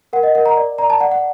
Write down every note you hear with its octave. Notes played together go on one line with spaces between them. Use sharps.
A#4 F#5
D#5
A#4 F#5
A#5
D5
D5 A#5
A5
D5 F#5
F#5